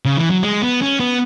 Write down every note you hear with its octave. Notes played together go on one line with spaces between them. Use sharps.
C#3
E3
F#3
G#3
B3
C#4
B3